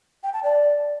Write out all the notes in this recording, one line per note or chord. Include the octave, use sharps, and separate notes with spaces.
G5
A5
D5